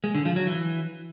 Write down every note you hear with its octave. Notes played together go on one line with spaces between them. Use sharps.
G#3
D3
F3
F#3
E3